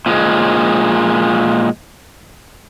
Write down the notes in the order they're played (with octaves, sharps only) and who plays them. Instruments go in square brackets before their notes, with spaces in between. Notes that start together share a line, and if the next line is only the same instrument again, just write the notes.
[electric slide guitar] A#2 F3 G#3